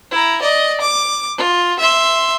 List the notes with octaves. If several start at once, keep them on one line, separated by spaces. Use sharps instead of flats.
E4 A#5
D5 D#5
D6
F4
E5 C6